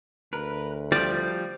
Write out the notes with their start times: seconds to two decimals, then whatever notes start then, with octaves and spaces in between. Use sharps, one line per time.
0.33 D2 A#4 B4
0.92 F3 G3 D5 G6